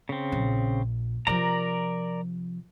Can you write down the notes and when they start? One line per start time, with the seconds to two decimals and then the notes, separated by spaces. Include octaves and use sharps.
0.09 C#3 C4
0.32 A#1 A#2
1.27 C3 F3 A#4 D5 A#5